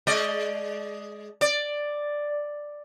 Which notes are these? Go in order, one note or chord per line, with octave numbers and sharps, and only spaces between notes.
G#3 D5 D#5
D5